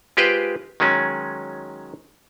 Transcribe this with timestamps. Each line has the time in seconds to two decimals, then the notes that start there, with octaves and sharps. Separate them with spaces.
0.17 G#3 F4 G4 B4 C5 G5
0.80 D#3 F#3 G#3 C#4